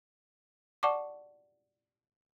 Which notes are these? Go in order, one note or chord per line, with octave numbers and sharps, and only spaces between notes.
D5 F#5 A5 C#6 D6